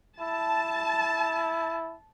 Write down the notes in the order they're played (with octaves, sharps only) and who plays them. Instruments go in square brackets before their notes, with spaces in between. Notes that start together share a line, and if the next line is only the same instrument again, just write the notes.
[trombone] E4 [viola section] A5